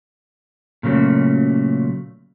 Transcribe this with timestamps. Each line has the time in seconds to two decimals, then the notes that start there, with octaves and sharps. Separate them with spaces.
0.83 A#2 C#3 F#3 A3